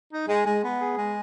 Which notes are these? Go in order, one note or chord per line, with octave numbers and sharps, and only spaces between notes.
D#4
G#3
G#3
B3
G#4
G#3